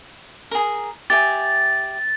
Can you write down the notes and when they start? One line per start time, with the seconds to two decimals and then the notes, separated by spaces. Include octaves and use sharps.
0.51 G#4 A#4
1.10 G4 E5 G#5 A6